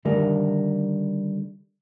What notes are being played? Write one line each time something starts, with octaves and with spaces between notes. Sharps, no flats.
D3 D#3 G3 A3 A#4